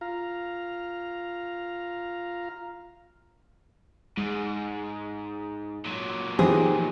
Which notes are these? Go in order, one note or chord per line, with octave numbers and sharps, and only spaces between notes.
F4 F5 A#5
G#2 G#3
A#2 F#3
E3 F3 B3 C4 D#4 G4 G#4